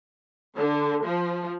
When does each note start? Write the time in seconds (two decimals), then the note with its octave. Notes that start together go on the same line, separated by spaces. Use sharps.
0.56 D3
1.05 F3